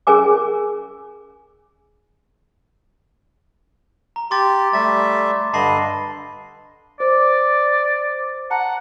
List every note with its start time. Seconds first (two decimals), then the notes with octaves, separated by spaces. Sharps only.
0.07 C#4 G#4 A#4 G#5 D6
4.16 A#5
4.31 G4 C6 D6 A6
4.73 G3 A3 E5 A6
5.54 G2 D3 D#5 A5 B5 C7
7.00 C5 D5
8.51 F#5 A5 A#5